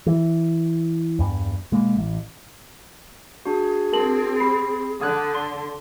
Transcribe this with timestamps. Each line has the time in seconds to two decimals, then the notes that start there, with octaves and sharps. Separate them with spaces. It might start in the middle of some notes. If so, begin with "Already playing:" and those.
0.06 E3
1.19 E2 G2
1.72 B2 G#3 A#3
1.97 A1
3.46 D4 F#4 G#4
3.93 C4 A#4 A5 F#7
4.40 G4 B5 C7
5.01 D3 F#5 D#6 F#6 G#6
5.35 C6